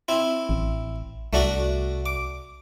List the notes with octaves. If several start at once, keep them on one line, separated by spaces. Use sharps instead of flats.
C4 E4
A1
C2 A3 D4 F#4
D6